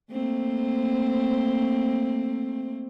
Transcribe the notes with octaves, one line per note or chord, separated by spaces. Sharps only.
A3 A#3 C4